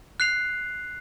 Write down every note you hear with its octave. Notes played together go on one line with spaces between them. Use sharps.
F#6 C7 F7